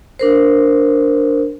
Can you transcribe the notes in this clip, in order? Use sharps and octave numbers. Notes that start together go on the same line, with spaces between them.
D4 A#4 C5